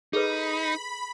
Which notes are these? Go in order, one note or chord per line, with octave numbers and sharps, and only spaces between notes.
D#4 G#4 A4 B4 B5